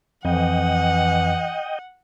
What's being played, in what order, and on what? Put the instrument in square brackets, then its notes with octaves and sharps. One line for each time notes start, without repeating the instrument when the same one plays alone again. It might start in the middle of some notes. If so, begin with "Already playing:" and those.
[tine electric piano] F2 [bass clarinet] E3 [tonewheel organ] D#5 G5 [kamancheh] F#5